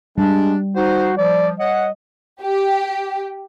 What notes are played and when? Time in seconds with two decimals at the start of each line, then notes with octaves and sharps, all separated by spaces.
0.18 G3 G#3 D4
0.76 D#4 F#4 C5
1.17 F3 D5
1.59 C#5 D#5 F#5
2.41 G4